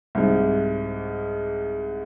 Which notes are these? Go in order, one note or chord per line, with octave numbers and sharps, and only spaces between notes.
C2 G#2